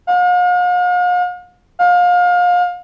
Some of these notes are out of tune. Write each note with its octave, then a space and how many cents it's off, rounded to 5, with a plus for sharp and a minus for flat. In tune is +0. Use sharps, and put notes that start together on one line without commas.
F5 +45
F5 +30